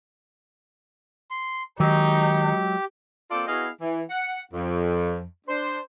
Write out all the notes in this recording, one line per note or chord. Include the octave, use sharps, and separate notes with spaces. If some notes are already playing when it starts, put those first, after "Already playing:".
C6
D#3 F#3 G#3 D#4 G4
A#3 C4 F4 A4 D5
B3 E4 F#4 G#4 D#5 F5
E3
F#5
F2
D4 C5